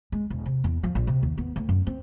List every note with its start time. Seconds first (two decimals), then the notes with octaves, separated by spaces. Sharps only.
0.12 G#3
0.30 E1
0.46 C3
0.64 E2
0.84 F3
0.95 A#1
1.07 C3
1.23 D#2
1.38 B3
1.56 D2
1.69 F#2
1.87 C4